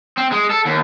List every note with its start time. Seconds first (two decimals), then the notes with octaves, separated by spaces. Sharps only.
0.17 C4
0.31 G#3
0.50 A4
0.65 D#2